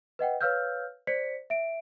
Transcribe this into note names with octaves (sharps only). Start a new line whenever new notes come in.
B4 D#5 F#5 G5
B4 C#5 F5 E6 F6 G6
C5 D5 B6 C#7
E5 D7